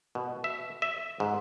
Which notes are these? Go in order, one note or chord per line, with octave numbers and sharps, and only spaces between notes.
B2
E5
E5
G#2